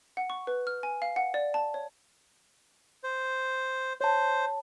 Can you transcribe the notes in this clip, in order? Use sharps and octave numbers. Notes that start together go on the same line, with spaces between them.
F#5
C#6
B4
F6
G#5
F5
F#5
D5
A5
C#5
C5
C5 C#5 A5